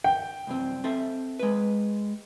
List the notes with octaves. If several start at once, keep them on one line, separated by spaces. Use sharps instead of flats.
G5
C2 F#2 C4
C4 A4 E5
G#3 B4